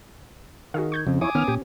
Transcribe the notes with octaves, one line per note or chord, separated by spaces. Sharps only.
D#3 F#4 G#4 F5
C#6 G6 G#6
F2 C#3 C4
E4 C#5 G#5 D6 D#6
D#3 B3 C#4 F6
A#2 G4